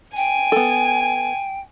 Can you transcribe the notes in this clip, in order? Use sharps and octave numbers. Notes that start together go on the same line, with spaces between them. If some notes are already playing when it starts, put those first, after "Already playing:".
G5 G#5
B3 A4